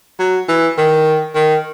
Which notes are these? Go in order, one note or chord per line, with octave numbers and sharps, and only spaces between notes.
F#3
E3
D#3
D#3